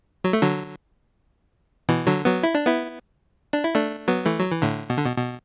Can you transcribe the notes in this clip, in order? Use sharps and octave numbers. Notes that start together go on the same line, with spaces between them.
F#3
A3
D3 F#3
B2 E3
D3 F#3
F#3 B3
E4
D4
B3 E4
D4
E4
A3 D4
F#3 B3
E3 A3
F#3
E3
A2 D3
B2
D3
B2
B2